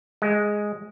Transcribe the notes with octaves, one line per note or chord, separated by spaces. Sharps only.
G#3